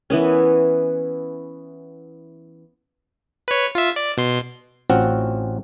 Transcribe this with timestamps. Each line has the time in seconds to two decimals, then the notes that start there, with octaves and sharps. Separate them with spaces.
0.10 E3 B3 C#4
3.48 B4 C#5
3.75 F4 E5
3.96 D5
4.17 B2 C6
4.90 A1 C4 C#4 F4 F#4 F#5